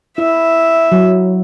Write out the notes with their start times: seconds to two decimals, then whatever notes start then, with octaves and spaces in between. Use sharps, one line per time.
0.18 E4 E5
0.92 F#3